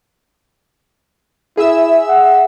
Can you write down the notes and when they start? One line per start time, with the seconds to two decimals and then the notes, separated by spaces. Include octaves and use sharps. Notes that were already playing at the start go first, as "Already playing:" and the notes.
1.57 E4 G#4 E5 E6
2.09 F#5